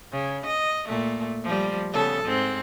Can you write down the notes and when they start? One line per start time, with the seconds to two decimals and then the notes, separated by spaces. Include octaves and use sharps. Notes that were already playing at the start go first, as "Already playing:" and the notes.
0.12 C#3
0.46 D#5
0.87 A#2 A3
1.44 F3 G3
1.92 C#3 B3 A4
2.24 G#2 C4